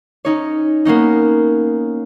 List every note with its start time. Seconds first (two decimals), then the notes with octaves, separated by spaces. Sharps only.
0.25 C#4 D#4 C#5
0.85 A#3 B3 C#4 D#4